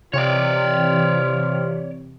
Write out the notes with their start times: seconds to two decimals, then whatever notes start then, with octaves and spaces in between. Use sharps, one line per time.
0.13 C3 E3 F4 C#5 D5